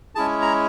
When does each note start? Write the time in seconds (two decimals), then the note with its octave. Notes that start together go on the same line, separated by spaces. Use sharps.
0.15 G#3 C#4 E4 G#4 A5
0.42 A#5